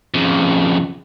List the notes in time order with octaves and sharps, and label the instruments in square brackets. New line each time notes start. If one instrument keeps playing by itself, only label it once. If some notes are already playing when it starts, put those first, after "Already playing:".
[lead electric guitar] F2 C#3